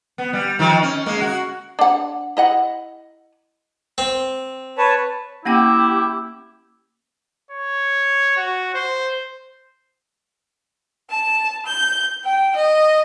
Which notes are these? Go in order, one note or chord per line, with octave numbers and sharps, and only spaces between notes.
B3
G3
D#3 F3
C#4
G#3 A#3
F#4
D4 F#5
E4 D#5 F#5
C4
B4 C#5 A5
A#3 C#4 E4 G4 G5
C#5
F#4
C5
A5
G6
G5
D#5